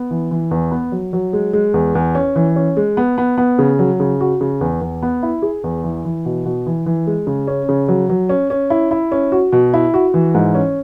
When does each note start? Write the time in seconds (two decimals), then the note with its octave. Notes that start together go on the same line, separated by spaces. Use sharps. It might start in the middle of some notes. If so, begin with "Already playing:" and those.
Already playing: B3
0.11 E3
0.31 E3
0.51 E2
0.71 B3
0.92 F#3
1.13 F#3
1.33 G#3
1.53 G#3
1.74 E2
1.95 E2
2.15 C#4
2.36 E3
2.56 C#4
2.77 G#3
2.97 B3
3.18 B3
3.38 B3
3.59 C#3
3.79 F#3
4.00 C#3
4.21 F#4
4.41 C#3
4.61 E2
4.81 E2
5.03 B3
5.23 E4
5.42 G#4
5.64 E2
5.84 E3
6.05 E3
6.25 B2
6.46 B2
6.66 E3
6.86 E3
7.07 G#3
7.27 C#3
7.47 C#4
7.69 C#3
7.88 F#3
8.09 F#3
8.29 C#4
8.50 C#4
8.70 E4
8.91 E4
9.12 C#4
9.32 F#4
9.52 B2
9.74 E4
9.94 F#4
10.14 E3
10.34 G#2
10.55 C#4